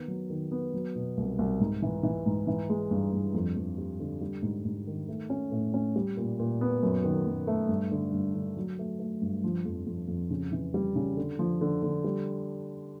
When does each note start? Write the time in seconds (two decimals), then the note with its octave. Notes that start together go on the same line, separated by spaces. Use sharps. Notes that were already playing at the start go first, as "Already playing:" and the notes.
Already playing: D#3 B3
0.08 F#3
0.30 D#3
0.51 B3
0.74 F#3
0.95 B2
1.17 C2
1.39 C2
1.60 G#2
1.82 E3
2.03 E3
2.26 G#2
2.47 E3
2.69 G#3
2.91 G2
3.12 G2
3.34 F2
3.56 F2
3.78 G3
4.00 D3
4.21 G3
4.43 G#2
4.65 G#2
4.87 D#3
5.08 A3
5.30 C#4
5.51 A2
5.74 C#4
5.96 G3
6.17 A#2
6.39 A#2
6.61 B3
6.83 F#2
7.04 D#3
7.26 F#2
7.47 A3
7.69 G2
7.91 D3
8.12 G2
8.35 D3
8.57 F#3
8.79 A3
8.99 A3
9.22 G2
9.44 F3
9.65 F2
9.86 F2
10.08 F2
10.30 C#3
10.52 E3
10.74 G3
10.96 C#3
11.17 D3
11.39 F3
11.61 D3
11.82 D3
12.04 G3